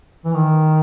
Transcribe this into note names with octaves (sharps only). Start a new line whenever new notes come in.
E3
D#3